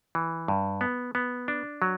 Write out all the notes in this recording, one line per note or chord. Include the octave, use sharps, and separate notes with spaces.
E3
G2
B3
B3
D4
F#3